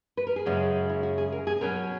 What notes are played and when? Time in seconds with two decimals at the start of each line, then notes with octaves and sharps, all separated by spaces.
0.17 B4
0.27 A#4
0.36 G#4
0.46 F#2 C#3 G#3 C#4
0.89 E4
1.03 F#4
1.18 G#4
1.32 A#4
1.47 G#4
1.61 B2 F#3 C#4 A#4